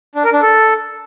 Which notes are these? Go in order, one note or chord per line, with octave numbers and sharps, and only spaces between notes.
D4
A#4
D4
A4